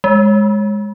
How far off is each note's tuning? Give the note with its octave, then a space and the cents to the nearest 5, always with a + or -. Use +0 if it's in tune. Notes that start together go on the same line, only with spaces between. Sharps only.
G#3 -5